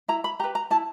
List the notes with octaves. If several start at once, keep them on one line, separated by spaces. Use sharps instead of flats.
E4 A#5
B5
G4 B4 A#5
A#5
E4 A5